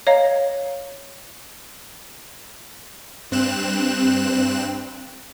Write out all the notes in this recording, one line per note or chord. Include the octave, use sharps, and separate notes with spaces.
C#5 D#5 F5 A#5
G2 C4 F#6 E7